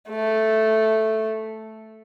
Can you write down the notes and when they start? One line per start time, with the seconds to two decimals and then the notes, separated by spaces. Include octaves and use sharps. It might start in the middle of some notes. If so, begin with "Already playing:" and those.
0.10 A3